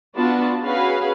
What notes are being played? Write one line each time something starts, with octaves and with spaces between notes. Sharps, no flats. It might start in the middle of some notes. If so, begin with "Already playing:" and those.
B3 D4 F4 F#4 A5
C#4 F#4 G#4 B4 F5